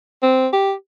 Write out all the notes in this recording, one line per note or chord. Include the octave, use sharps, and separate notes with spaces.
C4
G4